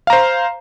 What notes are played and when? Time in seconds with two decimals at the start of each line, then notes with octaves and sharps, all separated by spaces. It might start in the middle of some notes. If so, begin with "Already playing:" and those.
0.07 F5
0.10 A#5
0.13 C5